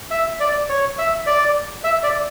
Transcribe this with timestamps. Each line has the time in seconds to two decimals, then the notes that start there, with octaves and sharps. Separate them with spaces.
0.11 E5
0.40 D5
0.69 C#5
0.98 E5
1.27 D5
1.84 E5
2.03 D5